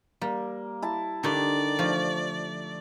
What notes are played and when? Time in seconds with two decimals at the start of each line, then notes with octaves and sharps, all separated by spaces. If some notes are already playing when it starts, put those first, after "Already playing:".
0.21 G3 A#3
0.82 E4 A5
1.23 D3 D#3 G4 D5
1.79 F3 A3